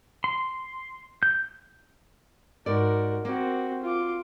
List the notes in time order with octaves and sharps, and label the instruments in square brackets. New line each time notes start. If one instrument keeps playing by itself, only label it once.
[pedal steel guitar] C6
G6
[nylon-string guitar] G#2 D5 [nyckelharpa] F#4 A#4
[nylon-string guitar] A#3 [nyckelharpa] C4 F#4
[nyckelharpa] F4 D6